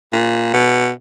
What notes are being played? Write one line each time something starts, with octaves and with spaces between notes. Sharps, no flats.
A#2
B2